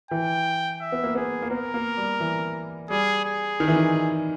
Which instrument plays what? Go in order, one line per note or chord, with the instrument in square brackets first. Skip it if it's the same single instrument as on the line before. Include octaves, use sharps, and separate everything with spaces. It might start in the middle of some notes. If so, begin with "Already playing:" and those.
[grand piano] E3 [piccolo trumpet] G5
[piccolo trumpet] E5
[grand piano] B3
A#3
[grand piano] B3 [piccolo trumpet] G#4
[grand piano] A#3
[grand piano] B3 [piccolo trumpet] A#4
[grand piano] A#3
G3
E3
[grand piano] G3 [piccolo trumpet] G#4
[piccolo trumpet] G#4
[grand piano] D#3
E3
D#3